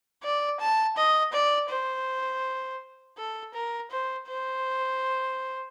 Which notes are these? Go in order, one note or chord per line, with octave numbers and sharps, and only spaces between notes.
D5
A5
D#5
D5
C5
A4
A#4
C5
C5